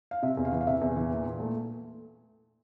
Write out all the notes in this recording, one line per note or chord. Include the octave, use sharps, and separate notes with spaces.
F5
C3 E5
E2
F5
E3
F5
C3 E5
E2
E3
A#2
A#2
A3